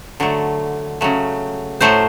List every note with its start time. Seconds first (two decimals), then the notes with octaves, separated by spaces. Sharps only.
0.20 D3 F#3 A3
1.01 C#3 F#3 A3
1.80 A2 F#3 A3 C5